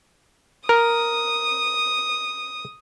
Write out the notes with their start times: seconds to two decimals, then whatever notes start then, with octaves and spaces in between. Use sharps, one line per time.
0.69 A#4 D#6